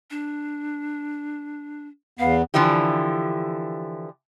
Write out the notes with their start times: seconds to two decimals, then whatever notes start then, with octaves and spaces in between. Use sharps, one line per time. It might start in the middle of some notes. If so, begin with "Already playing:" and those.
0.11 D4
2.19 E2 B3 F5
2.54 D3 E3 F3 E4 G4